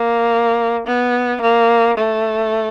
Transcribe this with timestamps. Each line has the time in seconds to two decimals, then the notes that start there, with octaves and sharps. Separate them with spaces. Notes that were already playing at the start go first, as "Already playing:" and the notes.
Already playing: A#3
0.87 B3
1.41 A#3
1.97 A3